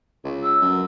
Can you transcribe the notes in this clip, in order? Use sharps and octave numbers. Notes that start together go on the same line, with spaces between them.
C#2
E6
F#2